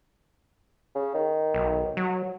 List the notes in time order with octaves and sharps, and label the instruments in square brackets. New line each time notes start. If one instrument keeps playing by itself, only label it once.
[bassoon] C#3
D#3
[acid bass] B1
F#3